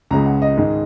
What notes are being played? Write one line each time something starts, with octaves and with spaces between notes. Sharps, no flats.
C#2 C#3 G#3 A#5
F#5
D#5
G#2 D#3 G#3